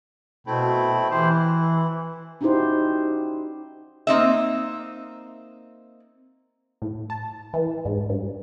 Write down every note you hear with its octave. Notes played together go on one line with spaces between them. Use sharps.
B2 A3 C4 E4
E3 E4 G4 C5
E4
C#4 D#4 E4 F#4 G4 C5
A#3 C4 D#4 E5
A2
A5
E3
G#2
G2